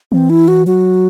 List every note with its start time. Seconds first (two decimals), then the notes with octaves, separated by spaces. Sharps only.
0.12 E3 C4
0.30 E4
0.48 F#4
0.66 F#3 F#4